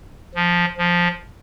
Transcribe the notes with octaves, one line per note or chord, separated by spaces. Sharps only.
F3
F3